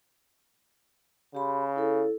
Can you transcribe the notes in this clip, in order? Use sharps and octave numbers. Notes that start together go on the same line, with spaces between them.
C#3 G4 B5 C6
E4 A4